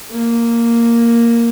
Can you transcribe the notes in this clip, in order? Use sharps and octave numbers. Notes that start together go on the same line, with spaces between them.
A#3